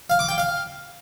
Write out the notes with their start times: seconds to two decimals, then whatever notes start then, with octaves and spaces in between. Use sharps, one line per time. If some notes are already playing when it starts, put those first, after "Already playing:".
0.10 F5
0.19 D6
0.29 G5
0.38 F5